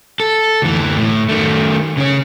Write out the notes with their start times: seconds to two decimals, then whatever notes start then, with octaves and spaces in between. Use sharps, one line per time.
0.20 A4
0.62 D2 E3
0.97 A2
1.29 D#3 A3
1.97 C#3 C#4